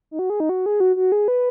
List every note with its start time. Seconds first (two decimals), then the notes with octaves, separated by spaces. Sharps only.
0.11 D#4
0.19 F#4
0.30 G#4
0.40 D#4
0.49 F#4
0.66 G#4
0.80 F#4
0.96 F#4
1.12 G#4
1.28 B4